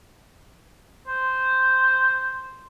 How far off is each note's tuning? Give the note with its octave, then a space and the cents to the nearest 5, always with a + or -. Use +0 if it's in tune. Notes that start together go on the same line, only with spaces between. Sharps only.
C5 -5